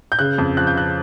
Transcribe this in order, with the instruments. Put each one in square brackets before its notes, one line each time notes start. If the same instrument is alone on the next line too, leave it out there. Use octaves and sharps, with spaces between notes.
[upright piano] G6
C#3 F#6
F2
F3 F#6
G6
C#3 F#6